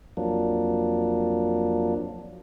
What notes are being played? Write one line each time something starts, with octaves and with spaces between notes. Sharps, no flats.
F2 F3 F#3 A#3 D4